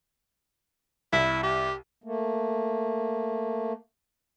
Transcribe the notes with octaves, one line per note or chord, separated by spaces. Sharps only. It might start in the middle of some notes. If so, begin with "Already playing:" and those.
C2 E4
G4
A3 A#3